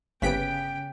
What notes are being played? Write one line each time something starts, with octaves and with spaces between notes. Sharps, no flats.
G1 C#3 B3 G4 B4 G5 B6 D7